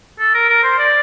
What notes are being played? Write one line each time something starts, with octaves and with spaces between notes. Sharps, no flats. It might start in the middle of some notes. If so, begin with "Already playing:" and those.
A4
A#4
A#4
C5
D5